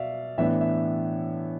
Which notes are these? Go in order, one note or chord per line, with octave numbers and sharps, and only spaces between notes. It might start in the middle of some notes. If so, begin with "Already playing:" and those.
Already playing: B2 D5 E5 F5
A2 E3 B3 D4 E5
E5